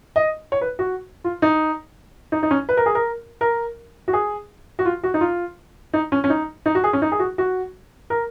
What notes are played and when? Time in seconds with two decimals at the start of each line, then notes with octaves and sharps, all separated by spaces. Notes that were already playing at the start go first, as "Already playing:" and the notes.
0.16 D#5
0.52 C#5
0.61 B4
0.79 F#4
1.24 F4
1.42 D#4
2.32 D#4
2.43 D#4
2.51 C#4
2.69 B4
2.77 A#4
2.86 G#4
2.95 A#4
3.41 A#4
4.08 F#4
4.13 G#4
4.79 F#4
4.85 F4
5.03 F#4
5.14 D#4
5.21 F4
5.94 D#4
6.12 C#4
6.24 C#4
6.30 D#4
6.66 D#4
6.75 F#4
6.84 G#4
6.93 C#4
7.02 D#4
7.12 G#4
7.19 F#4
7.38 F#4
8.10 A#4